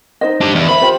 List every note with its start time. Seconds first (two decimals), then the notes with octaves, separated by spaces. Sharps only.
0.21 D#4 C5 D#5
0.41 D4 G4
0.55 E2
0.69 C5 E5 B5
0.82 F4 G4 C5